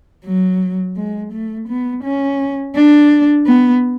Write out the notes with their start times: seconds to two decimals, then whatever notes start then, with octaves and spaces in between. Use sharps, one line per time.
0.25 F#3
0.97 G#3
1.32 A3
1.68 B3
2.03 C#4
2.75 D4
3.46 B3